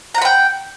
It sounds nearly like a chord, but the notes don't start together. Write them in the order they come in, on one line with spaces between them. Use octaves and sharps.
A#5 F#5 B5 G5